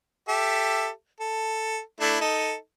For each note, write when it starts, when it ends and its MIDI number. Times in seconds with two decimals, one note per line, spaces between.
0.28 0.88 67
0.28 0.88 69
0.28 0.88 76
1.20 1.80 69
2.00 2.18 57
2.00 2.18 62
2.00 2.18 64
2.21 2.55 63
2.21 2.55 69